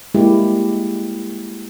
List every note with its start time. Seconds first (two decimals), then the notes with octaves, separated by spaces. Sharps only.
0.14 G3 G#3 A#3 E4 G4